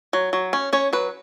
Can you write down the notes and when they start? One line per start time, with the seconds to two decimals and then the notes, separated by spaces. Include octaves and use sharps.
0.13 F#3
0.33 F#3
0.53 C#4
0.73 C#4 C#5
0.93 F#3 B4